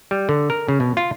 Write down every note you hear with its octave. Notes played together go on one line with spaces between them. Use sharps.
G3
D3
A#4
C#3
B2
F4